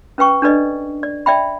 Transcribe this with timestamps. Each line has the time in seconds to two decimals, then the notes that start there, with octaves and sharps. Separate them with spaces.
0.18 C#4 B4 G5 C#6
0.42 D4 A4 B4 D5 D#5
1.03 D5
1.26 D5 E5 G5 B5